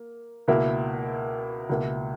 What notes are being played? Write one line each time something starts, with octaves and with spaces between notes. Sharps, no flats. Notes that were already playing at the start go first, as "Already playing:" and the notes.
Already playing: A#3
C#2 B2 A#3 E4
C#2 B2 A#3 E4